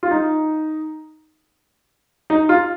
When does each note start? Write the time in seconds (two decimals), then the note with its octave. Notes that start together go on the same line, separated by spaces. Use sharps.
0.03 F4
0.11 D#4
2.30 D#4
2.49 F4